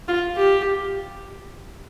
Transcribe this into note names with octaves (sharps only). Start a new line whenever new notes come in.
F4
G4